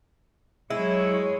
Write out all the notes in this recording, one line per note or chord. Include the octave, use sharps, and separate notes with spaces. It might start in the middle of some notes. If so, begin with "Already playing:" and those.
F#3 G#3 E4 C#5